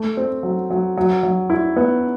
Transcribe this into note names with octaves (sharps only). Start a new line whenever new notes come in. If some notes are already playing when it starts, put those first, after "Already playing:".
Already playing: A3
C4
F#3
F#3
F#3
F#3
E4
B3